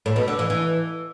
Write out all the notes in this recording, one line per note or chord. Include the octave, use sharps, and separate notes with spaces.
A2
B2
D3
E3
E3